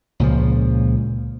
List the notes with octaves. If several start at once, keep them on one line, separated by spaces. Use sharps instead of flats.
C#2 A#2 C#3 F3